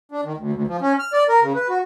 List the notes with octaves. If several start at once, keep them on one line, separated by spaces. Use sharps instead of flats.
D4
D#3
D2
D2
F3
C#4
F6
D5
A#4
C#3
B4
F#4